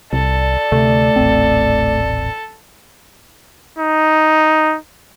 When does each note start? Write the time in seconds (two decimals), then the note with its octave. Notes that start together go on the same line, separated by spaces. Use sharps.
0.13 C2 A4 D5
0.72 D2 C3 A3
1.16 D#1 A1 C4
3.78 D#4